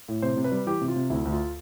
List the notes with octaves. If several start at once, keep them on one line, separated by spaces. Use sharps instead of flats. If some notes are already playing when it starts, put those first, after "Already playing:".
A2
C3 C5
C3
B4
G3
E3 G4
C3
F4
C3
D2 E4
D2
F4